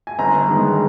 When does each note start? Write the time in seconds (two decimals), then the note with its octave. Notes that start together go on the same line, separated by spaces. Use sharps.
0.07 G#5
0.19 G1 A#5
0.47 G2 D#3 G#3 B3